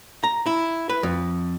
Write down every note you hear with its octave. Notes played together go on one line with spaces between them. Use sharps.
A#5
E4
B4
F2